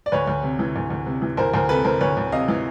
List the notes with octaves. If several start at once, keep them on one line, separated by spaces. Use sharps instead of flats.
D5
D2 B4 C#5
D2
C3
E3
D2
D2
C3
E3
D2 A#4 C5
D2 A#4 C5
C3 A4 B4
E3 A#4 C5
D2 B4 C#5
D2
C3 D#5 F5
E3